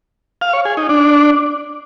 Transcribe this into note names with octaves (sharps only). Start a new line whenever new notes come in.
F5
C#5
G#4
D#4
D4